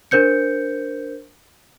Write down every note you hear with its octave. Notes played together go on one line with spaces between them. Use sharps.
D4 A#4 C5 G6 C#7